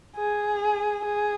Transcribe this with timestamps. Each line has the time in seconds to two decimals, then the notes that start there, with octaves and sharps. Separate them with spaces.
0.17 G#4
1.05 G#4